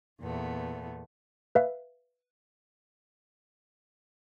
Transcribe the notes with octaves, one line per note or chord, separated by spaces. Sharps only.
E2 A#2 A3 B3
B4 E5 F5